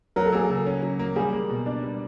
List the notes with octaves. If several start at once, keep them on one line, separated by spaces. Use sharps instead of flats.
F#3 A#4
A4
A#3 G#4
A4
C#3
C#4
F#3
A#3
G3 G#4
A#3
B2
D4
G3